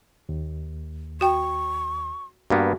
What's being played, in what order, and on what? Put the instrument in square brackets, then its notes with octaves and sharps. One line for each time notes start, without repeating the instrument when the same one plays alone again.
[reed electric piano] D#2
[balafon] F#4 G5 [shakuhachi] C#6
[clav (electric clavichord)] G2 A#3 B3 [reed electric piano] F#4